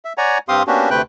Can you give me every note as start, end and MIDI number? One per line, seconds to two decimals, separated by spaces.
0.05 0.13 76
0.18 0.38 73
0.18 0.38 74
0.18 0.38 78
0.18 0.38 80
0.18 0.38 82
0.49 0.63 43
0.49 0.63 60
0.49 0.63 67
0.49 0.63 77
0.49 0.63 84
0.49 0.63 87
0.67 0.90 58
0.67 0.90 59
0.67 0.90 61
0.67 0.90 62
0.67 0.90 66
0.67 0.90 67
0.90 1.02 38
0.90 1.02 48
0.90 1.02 57
0.90 1.02 71
0.90 1.02 79
0.90 1.02 90